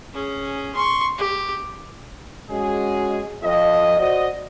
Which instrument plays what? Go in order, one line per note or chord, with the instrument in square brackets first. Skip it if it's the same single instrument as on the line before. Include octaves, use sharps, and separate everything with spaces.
[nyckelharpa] C#4 G#4
C6 C#6
G4
[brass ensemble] G#3 C#4 F#4 G#4
F2 D#5
F#4 C5 D5 D#5